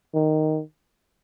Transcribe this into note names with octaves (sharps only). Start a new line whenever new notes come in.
D#3